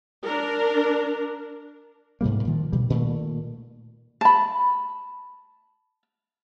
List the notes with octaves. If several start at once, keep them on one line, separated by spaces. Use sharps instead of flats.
D4 A#4
G#2 C3 G3 A#3
A#2 D#3 F3
B2 D3 G3
A#2 D#3 A3
A5 B5